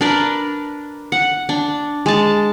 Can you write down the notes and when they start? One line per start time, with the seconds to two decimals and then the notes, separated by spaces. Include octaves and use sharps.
0.01 D4 A#4 B4
1.12 F#5
1.49 D4
2.06 G#3 A5